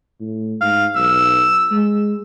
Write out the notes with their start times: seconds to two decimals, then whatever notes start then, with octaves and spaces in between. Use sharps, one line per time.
0.21 A2
0.61 G#2 F5
0.96 B1 E6
1.72 G#3